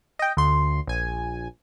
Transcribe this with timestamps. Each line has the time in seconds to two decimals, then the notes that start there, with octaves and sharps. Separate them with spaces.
0.19 D#5 G5
0.37 D2 C6
0.87 A#1 G#5